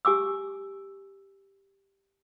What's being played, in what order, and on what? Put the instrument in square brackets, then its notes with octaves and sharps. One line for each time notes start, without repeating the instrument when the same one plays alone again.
[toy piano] G4 G#5 D6 E6